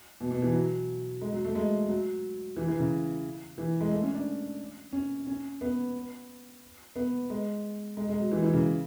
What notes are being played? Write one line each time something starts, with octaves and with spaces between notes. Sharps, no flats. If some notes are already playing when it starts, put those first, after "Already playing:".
B2
B2
E3
F#3
G#3
F#3
A3
G#3
F#3
E3
E3
C#3
E3
G#3
A3
C#4
D4
C#4
C#4
B3
B3
G#3
G#3
G#3
F#3
E3
E3
C#3